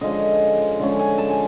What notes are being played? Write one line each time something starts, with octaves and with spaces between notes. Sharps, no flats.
D3 F3 G#3 C#4 D#5
D3 F3 G#3 C#4
G#5
A5
G#5